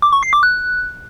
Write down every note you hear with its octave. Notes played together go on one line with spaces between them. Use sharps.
D6
C#6
C7
D6
F#6